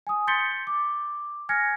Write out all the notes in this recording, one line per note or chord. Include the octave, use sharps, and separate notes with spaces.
G#5 D#6
C6 G6 A6 B6 C#7 G7
D6
G#5 F6 G#6 A#6 C#7